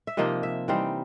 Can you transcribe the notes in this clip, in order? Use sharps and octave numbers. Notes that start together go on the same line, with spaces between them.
E5
C3 F3 A#3 D#4 D#5
E5
E3 G3 C4 D#4 F5